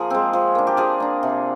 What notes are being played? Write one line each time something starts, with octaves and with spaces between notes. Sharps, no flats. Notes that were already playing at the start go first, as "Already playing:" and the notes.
Already playing: F3 A#3 G#4 A#4
G#3 C4
F3
A#3 D4
G4
F3 G#4
A#3 D4
C3